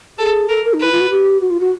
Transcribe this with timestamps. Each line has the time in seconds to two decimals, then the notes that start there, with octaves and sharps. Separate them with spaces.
0.18 G#4 A4
0.49 A4 A#4
0.64 A#4
0.73 D#4
0.80 E4 B4
0.92 F4
1.01 F#4
1.10 G4
1.41 F#4
1.50 F4
1.60 F#4